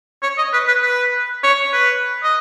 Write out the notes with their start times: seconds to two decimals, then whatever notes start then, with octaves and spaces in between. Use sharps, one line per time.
0.23 C#5
0.38 D#5
0.53 B4
0.68 B4
0.83 B4
1.43 C#5
1.73 B4
2.24 D#5